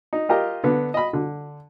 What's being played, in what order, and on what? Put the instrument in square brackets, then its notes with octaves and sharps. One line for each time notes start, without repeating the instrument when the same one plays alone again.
[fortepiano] D#4
F4 G4 A#4 D#5
D3 B3
D#5 B5
D3